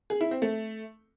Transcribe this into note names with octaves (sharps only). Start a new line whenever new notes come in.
G#4
E4
C4
A3